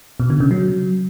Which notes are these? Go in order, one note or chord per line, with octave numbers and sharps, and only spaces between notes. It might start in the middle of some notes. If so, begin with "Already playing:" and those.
B2
D3
C#3
F#3